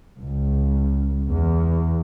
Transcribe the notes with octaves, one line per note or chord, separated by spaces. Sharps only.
C#2
E2